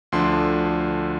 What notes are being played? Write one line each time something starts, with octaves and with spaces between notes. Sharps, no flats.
D2 D3 F3 D4 C6